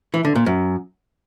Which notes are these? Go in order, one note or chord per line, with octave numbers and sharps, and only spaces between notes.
E3
D3
A#2
F#2